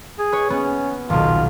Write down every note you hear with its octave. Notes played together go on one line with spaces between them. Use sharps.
G#4
B4 C#5
B3 C#4
D#1 B1 F4